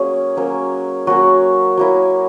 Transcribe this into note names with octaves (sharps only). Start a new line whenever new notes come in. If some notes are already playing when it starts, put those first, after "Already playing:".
Already playing: F#3 A#3 C#4 G#4
F#3 A#3 C#4
F#3 A#3 C#4 F#4
F#3 A#3 E4